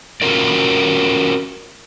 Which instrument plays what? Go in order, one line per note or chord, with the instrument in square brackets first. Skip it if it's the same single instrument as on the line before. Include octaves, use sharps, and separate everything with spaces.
[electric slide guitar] C#4 F4 F#4 A#4 D5